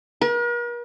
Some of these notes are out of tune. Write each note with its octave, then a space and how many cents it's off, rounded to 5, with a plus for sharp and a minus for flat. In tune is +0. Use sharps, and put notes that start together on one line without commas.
A#4 +45